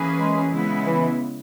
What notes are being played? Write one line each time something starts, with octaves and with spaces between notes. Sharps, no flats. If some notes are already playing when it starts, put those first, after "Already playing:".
Already playing: E3 A#3 C#4 G#4 B4
G#3
C#3 G#3 B3 E4
E3